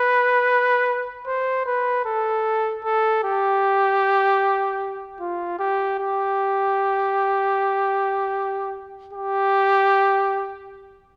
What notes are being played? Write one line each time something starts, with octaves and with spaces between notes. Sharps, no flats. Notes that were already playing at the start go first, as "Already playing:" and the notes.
Already playing: B4
C5
B4
A4
A4
G4
F4
G4
G4
G4